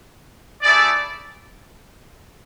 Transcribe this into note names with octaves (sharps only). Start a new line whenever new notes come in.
A3 E4 G#4 D5